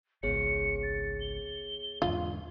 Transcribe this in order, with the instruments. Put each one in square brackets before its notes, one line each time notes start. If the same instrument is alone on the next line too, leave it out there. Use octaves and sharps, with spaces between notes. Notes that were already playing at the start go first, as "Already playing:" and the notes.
[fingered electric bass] G#1 C#2 [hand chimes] B3 G#4 C#5 [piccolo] C#7
[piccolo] A6
G7
[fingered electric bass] E2 G#2 D3 [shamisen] F4